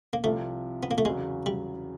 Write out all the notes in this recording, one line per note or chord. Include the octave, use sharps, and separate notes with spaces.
A#3
C2 C3 F3 A3
B3
A#3
A3
E2 C#3 F#3 G#3
G3